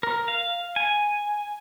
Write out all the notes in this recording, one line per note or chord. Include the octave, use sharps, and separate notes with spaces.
A#4
F5
G#5